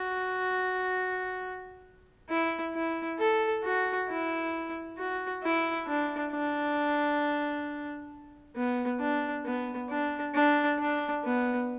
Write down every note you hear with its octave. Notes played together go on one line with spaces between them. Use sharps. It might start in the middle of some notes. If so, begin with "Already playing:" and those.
Already playing: F#4
E4
E4
A4
F#4
E4
F#4
E4
D4
D4
B3
D4
B3
D4
D4
D4
B3